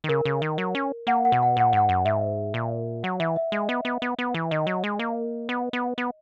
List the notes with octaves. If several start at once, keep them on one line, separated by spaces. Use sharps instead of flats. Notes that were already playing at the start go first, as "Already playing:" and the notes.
D#3
C#3 A#4
C#3
D#3
F#3
C#4
A#3 F#5
F#5
B2
F#5
A#2 F#5
G#2 F#5
F#2
G#2 E5
A#2
F#3 F#5
E3 E5
E5
G#3 D#5
B3
B3
B3
B3
E3
D#3 D#5
F#3
G#3
A#3
B3
B3
B3